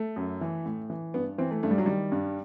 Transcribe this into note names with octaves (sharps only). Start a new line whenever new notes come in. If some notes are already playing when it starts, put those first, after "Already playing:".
Already playing: A3
F#2
E3
A2
E3
G2 B3
E3 C4
A3
G2 A3
G3
F#3
D#3 G3
G2